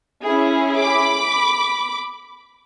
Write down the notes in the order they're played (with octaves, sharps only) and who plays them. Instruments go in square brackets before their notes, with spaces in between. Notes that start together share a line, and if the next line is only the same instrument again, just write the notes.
[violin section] C#4 E4 G#4
B5 D6